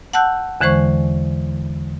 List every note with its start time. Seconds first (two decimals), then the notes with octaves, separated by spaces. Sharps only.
0.13 F#5 A5 E6 F#6 G6
0.61 E2 D3 E3 G#3 C5 C#6